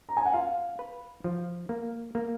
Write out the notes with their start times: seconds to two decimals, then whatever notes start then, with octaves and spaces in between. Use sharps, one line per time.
0.09 A#5
0.17 G#5
0.25 F#5
0.34 F4 F5
0.79 B4
1.24 F3
1.69 A#3
2.15 A#3